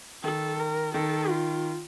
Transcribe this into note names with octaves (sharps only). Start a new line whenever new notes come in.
D#3 A4
A#4
D#3 A4
F4